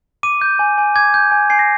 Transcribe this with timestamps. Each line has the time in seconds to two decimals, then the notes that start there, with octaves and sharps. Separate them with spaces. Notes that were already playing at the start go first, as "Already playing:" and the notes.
0.23 D6 D#7
0.41 G6
0.59 G#5
0.78 G#5
0.95 D6 G#6
1.14 G6
1.32 G#5
1.50 G#5 C7
1.59 A#6